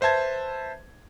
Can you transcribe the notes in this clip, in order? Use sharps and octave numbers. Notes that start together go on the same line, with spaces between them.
B4 C5 E5 A5 G#6